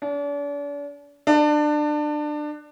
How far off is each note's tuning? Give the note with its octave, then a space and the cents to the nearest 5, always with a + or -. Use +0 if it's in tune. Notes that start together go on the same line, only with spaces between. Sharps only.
D4 -40
D4 +25